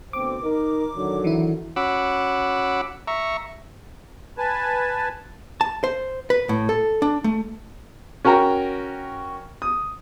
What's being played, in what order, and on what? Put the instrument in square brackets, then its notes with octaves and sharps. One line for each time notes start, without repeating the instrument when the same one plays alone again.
[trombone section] D2 B2 C4 [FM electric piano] D6
[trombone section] D#4 A#4
D3 D#3 F#3
[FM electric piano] E3 E4
[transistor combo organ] C#4 F#4 F#5 B5 D6 E6
E5 A#5 C#6
[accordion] B4 G#5 A5
[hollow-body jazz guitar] A5
C5
B4
A2
A4
D4
A3
[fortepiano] C#4 F#4 A#4 G5 A#5
D#6